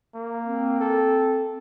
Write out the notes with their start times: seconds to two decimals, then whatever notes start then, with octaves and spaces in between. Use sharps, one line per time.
0.15 A#3
0.43 C4
0.81 A4